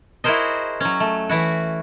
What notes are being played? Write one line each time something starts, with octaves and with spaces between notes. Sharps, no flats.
E4 F#4 G#4 A#4 C5 D#5
F#3 C#4
A3
E3 E4 F#4